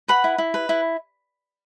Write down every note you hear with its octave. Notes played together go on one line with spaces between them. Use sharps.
B4 F#5 B5
E4
E4
B4
E4